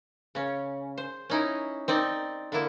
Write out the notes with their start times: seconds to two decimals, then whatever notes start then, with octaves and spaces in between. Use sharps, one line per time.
0.35 C#3 C#4
0.98 C5
1.30 C#4 D#4 E4
1.88 C4 D#4 D5
2.52 D3 A#3 E4